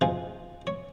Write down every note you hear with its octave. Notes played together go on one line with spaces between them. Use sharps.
B2 F3 D#4 F4 G#4
C#5